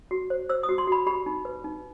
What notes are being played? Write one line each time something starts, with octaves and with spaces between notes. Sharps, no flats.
F#4
C5
C5 E6
D#6
F#4
C6
F#4 B5
G4 B5
D#4
B4
D#4